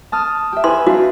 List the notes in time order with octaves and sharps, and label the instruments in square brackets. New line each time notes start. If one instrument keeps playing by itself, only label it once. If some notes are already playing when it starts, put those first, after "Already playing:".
[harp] A5 D#6 F6
G4 E5
[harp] B4 G#5 [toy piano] C6
[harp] D4 D#4 F5 [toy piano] F#4